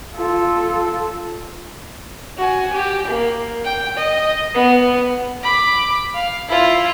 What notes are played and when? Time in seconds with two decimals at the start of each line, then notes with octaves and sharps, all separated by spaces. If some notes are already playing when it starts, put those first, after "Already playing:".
0.16 F4 A4
2.37 F#4 G#5
2.73 G4
3.07 A#3
3.64 G5
3.97 D#5
4.54 B3
5.43 B5 D6
6.15 F5
6.48 E4 F4